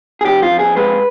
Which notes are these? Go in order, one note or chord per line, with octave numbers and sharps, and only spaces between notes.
G#4
F2 G4
F4
F2
G#4
G#3 B4